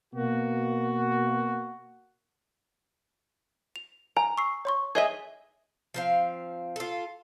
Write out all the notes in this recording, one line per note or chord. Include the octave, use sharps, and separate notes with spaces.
B2 A#3 F#4
F7
G#5 A#5
C#6 E6 C7
C#5 C6 C#6
G#4 D#5 E5 G#6 D#7
F3 C4 F5
F4 A4